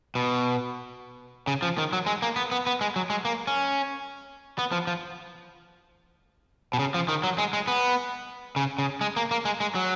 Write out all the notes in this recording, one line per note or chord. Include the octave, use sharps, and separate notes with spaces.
B2
C#3
F3
D#3
F#3
G#3
A#3
B3
B3
B3
G#3
F#3
G#3
A#3
C#4
B3
F3
F3
B2
C#3
F3
D#3
F#3
G#3
G#3
B3
C#3
C#3
G#3
A#3
A#3
G#3
G#3
F#3